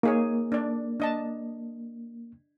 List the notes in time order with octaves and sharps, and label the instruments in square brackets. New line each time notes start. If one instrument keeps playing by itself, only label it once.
[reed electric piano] A#3 [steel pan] D#4 G#4 C#5
[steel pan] D4 D5
D4 D#5 A5